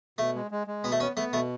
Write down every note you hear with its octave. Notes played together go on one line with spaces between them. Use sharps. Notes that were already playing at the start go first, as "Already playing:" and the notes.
B2 A3
G#3
G#3
G#3
B2 B3
A3
B3 C#4
A3 B3
B2 A3